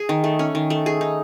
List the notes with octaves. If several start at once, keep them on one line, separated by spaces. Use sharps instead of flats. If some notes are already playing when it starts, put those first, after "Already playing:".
Already playing: G#4
D#3
A3
C#4
D#3
A3
G#4
D#4